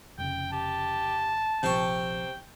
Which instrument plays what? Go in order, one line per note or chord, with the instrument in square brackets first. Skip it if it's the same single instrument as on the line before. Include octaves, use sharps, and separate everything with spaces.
[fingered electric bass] F1 C#3 [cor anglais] G5
[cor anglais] G4 [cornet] A5
[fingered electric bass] A#1 F3 [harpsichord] C3 C#6 [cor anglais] G5